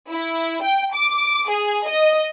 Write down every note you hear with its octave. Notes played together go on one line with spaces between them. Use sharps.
E4
G5
D6
G#4
D#5